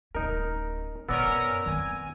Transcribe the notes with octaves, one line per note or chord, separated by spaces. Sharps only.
D1 C#4 D#4 A#4
A1 F#2 B3 C#4 A#4 D5 E6 A#6
D#3 C4 G#5